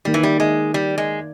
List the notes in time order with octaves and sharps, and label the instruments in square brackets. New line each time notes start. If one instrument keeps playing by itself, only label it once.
[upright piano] D#3 A#3 D#4 [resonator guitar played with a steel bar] G3
[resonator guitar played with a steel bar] E3
G3
G#3
G3
G#3